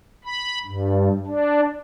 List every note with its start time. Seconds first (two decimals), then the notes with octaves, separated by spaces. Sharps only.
0.25 B5
0.66 G2
1.27 D4